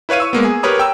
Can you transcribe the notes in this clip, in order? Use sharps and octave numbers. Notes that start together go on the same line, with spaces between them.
E4 B4 C#5 F5 D#7
C#6 E6
G#3 A#3 B3
G#4
G4 A#4 B4 C#5 A#5 D#6
G5 E6